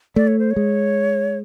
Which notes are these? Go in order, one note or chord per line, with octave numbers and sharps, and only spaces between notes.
A3 D5
C#5
C5
C#5
G#3